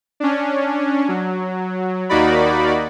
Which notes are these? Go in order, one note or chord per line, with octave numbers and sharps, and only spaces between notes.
C#4 D4
F#3
D#2 A#3 D#4 F#4 D5 B5